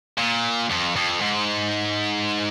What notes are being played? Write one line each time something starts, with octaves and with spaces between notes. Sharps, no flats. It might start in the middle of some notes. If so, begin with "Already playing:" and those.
A#2
F2
F2
G#2